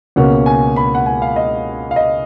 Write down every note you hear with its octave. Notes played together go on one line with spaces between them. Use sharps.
C#2 B2 A#3 C#4 F#5
G#5
B5
F#5
G#5
F5
D#5
F5
D#5